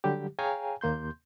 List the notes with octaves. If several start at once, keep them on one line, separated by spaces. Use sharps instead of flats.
D3 F#3 G3 G4
G#4 C#5 F5 G5 G#5 A#5
D#2 A#3 C6 G6